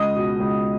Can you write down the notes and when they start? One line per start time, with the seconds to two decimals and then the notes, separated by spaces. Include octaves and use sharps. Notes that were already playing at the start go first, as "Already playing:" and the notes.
Already playing: C#2 D#5 D#6
0.16 B2
0.40 C#2